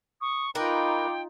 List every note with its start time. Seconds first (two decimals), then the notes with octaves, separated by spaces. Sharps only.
0.21 C#6 D#6
0.55 D#4 F4 A#4 B4 G5 A#5 D6